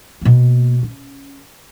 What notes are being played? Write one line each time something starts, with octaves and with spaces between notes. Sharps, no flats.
B2 A#3
C#4